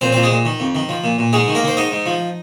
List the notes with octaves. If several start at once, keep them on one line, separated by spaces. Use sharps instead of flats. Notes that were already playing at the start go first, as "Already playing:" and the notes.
A#2 C4 C5
A#2 C4 C5
G#3 G#4
A#2
D#3
F2
D#3
F3
A#2
A#2
G#2 G#3 G#4
D#3
A#3 A#4
D#3 C5
G#2 D#4 D#5
G#2
F3